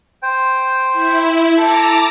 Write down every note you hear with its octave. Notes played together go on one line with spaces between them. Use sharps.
C5 G5
E4
A4 A5 A#5 D6